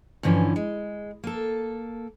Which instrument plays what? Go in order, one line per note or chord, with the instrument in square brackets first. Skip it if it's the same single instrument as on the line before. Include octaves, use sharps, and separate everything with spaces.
[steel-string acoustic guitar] G2 D3 E3 F3 C#4
G#3
A#3 A4